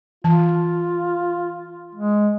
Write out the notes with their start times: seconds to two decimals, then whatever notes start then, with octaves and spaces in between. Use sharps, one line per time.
0.24 E3 F4 A5
1.95 G#3